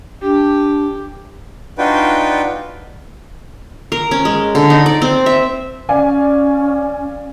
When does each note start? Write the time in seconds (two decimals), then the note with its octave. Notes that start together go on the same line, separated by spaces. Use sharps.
0.22 D4 G4
1.78 D4 D#4 F4 F#4 B4 G5
3.92 A#4
4.11 C#4
4.25 G#3
4.55 D3
4.70 D#4
4.86 D5
5.02 C4
5.26 E5
5.89 C#4 D5 F5 G#5